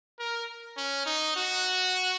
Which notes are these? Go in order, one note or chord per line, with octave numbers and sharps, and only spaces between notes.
A#4
C#4
D#4
F#4